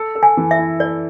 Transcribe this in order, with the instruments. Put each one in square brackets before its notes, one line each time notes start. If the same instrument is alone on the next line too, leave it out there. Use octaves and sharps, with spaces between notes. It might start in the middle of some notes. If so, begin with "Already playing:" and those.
Already playing: [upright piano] A4
A4
[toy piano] G#5
[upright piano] E3
[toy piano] E5
[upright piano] E4
[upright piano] A4 [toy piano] D5